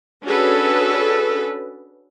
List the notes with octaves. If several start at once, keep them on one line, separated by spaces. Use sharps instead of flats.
C#4 D4 F#4 G#4 A4 B4